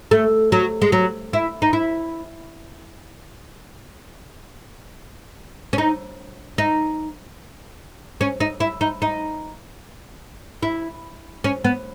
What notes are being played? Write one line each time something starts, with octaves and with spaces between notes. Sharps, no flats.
A3
F#3
G#3
F#3
E4
D#4
E4
C#4
D#4
D#4
C#4
D#4
E4
D#4
D#4
E4
C#4
B3